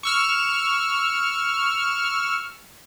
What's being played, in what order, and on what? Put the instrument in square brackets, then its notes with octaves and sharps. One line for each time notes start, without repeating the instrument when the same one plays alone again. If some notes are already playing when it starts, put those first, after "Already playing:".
[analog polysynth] C#6 E6 F6